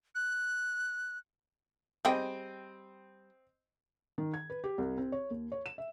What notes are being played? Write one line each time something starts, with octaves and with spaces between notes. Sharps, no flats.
F#6
G3 C4 G#4 D#5 G5
D#3
G#6
B4
G4
C2
C4
C#5
D#2
C#5
E7
E5